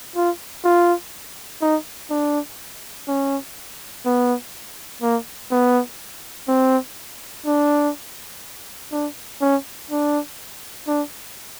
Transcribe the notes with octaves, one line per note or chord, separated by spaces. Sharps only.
F4
F4
D#4
D4
C#4
B3
A#3
B3
C4
D4
D4
C#4
D4
D4